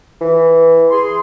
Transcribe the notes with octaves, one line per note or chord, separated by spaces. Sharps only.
E3
G#4 C6